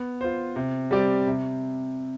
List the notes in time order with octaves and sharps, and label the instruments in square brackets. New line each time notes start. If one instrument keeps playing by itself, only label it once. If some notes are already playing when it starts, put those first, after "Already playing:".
Already playing: [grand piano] B3
F4 C5
C3
G3 C4 G4 D5
C3